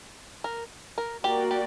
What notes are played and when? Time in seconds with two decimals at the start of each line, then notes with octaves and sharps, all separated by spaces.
0.44 A#4
0.98 A#4
1.24 A#3 F#4 G4 A#4 D5
1.51 G4